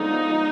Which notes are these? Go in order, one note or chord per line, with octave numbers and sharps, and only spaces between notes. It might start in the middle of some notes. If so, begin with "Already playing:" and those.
Already playing: D3 F3 G#3 B3 D#4